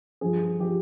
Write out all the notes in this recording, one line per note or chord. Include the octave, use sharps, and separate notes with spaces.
G2 F3 G#4
F3 G4